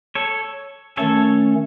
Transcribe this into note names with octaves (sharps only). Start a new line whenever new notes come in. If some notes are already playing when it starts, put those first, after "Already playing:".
A4 C#5
D#3 A3 C#4 A4 C#5